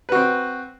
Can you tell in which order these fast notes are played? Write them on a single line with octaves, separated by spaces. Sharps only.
B4 F#4 C4